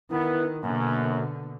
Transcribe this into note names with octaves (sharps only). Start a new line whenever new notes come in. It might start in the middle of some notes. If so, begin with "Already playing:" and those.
D#3 B3 E4
F#2 B2 D3 A#3